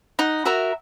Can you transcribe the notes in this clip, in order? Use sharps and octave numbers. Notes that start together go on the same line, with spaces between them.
D#4 F#5
F#4 A#4 E5